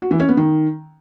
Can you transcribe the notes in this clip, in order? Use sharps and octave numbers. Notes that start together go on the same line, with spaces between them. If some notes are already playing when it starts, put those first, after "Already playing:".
F#4
E3
C#4
B3
D#3